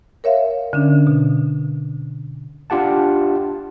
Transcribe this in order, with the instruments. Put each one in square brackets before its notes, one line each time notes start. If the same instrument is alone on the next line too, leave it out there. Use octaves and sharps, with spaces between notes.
[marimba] A#4 C#5 E5 F5
D3 C#4 D4
B2
[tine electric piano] D4 F4 G4 F#5 A5